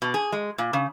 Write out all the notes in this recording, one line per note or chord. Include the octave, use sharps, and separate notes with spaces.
B2
G#4
G#3
A#2
C#3